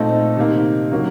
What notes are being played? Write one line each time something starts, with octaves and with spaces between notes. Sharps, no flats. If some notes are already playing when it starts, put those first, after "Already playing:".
Already playing: A#2 A3 C4 D#4 A4 D#5
C3 D#3 A#3 D#4
C#3 F#3 A#3 D#4